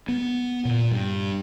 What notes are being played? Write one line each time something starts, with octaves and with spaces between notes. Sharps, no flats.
B3
A#2
G2